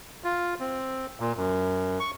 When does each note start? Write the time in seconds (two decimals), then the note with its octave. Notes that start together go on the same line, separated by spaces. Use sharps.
0.24 F4
0.60 C4
1.20 A#2
1.37 F#2
2.00 C#6